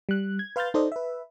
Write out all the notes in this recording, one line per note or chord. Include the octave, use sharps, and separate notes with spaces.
G3 F#6
G#6
B4 F5 C6 F6 G6 A6
D#4 A4 C5 D5 D#5
B4 E5